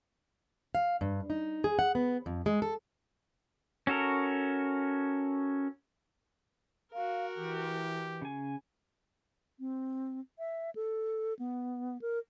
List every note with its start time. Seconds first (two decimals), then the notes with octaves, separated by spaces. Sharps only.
0.75 F5
1.01 G2
1.30 D#4
1.64 G#4
1.79 F#5
1.95 B3
2.26 F2
2.46 G#3
2.62 A4
3.87 C#4 F#4 A4 A#4
6.94 F#4 A#4 F5
7.36 E3 G4
8.22 C#3 G#5
9.59 C4
10.39 E5
10.75 A4
11.39 B3
12.02 A#4